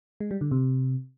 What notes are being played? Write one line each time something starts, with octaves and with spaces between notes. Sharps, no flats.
G#3
G3
D3
C3